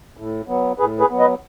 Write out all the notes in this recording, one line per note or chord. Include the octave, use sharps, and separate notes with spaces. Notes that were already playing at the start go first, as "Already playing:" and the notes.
A2
F#3 B3
A2 G#4 B4
G#4 B4
F#3 B3
B4 D#5